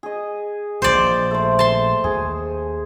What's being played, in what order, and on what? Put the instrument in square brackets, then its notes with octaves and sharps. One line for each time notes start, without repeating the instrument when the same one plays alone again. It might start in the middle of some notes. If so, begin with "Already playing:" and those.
[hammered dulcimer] G#4 D#5
[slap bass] A#1 A#2 [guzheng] C5 D5
[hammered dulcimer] A3 C5
[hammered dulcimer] C5 [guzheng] A5 C6
[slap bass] D#2 [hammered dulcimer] G#4